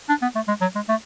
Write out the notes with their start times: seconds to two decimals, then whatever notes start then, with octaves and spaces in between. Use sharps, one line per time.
0.09 D4
0.22 B3
0.35 A3
0.48 G#3
0.61 F#3
0.75 G#3
0.89 A3